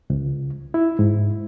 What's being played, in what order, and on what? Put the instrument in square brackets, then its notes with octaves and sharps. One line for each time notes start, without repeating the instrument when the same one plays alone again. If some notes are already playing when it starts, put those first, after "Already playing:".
[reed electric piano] C#2
E4
G#2